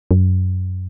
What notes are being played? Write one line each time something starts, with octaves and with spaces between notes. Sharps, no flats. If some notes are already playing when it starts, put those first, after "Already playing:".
F#2